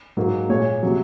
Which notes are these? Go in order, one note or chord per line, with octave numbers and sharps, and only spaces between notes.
G#2 F#3 A#3
A#2 G#3 C#5
C3 F#3